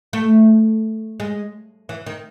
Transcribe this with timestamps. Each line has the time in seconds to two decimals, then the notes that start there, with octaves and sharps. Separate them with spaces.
0.13 A3
1.20 G#3
1.89 E3
2.06 D#3